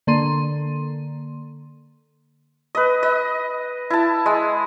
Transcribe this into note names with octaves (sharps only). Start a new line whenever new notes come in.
D3 A#3 A4 C6 D#7
B4 D#5
D#5
E4 A5
G#3